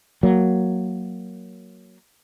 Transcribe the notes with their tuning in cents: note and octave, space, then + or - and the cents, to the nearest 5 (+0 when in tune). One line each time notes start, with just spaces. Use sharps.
F#3 +0 A#3 +0